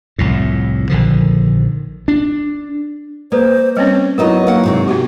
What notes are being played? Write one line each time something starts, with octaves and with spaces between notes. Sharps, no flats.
C2 F2 A2
A#1 D3 D#3 F3
D4
A#3 A4 B4 C5 D5
G3 C4 C#4 C#5
F#3 B3 D#4 E4 A4 A#4 D#5
A#3 F#5
G#2 C3 D#3
B3 F#4 G4